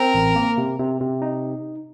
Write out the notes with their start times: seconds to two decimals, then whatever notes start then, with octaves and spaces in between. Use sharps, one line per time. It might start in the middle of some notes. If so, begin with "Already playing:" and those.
Already playing: C4 A#4
0.14 A1
0.36 A#3
0.58 C3
0.79 C3
1.00 C3
1.22 D#4